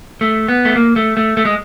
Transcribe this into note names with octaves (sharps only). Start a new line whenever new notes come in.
A3
B3
A3
A#3
A3
A3
A3
G#3